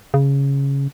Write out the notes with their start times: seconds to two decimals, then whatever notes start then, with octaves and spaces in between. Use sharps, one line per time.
0.14 C#3